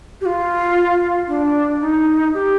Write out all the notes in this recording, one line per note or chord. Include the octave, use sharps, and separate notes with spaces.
G4
F4
D4
D#4
G4